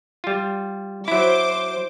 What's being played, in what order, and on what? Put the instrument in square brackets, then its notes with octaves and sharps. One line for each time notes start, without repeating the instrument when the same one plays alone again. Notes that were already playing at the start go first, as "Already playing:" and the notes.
[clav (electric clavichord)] G3 F4
[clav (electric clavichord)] F#3 E4 [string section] C5 D6